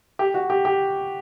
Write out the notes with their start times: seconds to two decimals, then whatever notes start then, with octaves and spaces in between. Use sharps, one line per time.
0.19 G4
0.34 F#4
0.50 G4
0.65 G4